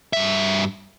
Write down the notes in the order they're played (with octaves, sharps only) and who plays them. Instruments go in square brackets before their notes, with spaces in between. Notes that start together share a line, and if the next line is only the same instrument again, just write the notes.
[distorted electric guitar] G2 E5